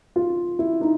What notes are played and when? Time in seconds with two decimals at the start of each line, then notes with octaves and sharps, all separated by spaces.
0.16 F4
0.59 E4
0.81 D#4